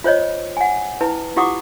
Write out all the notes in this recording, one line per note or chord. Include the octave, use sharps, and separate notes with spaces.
F4 C5 C#5 D#5
F#5 G#5
E4 B4 A5
E4 F4 G4 F#5 D6 D#6